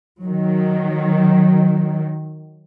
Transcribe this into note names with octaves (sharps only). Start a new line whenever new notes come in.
D#3 F#3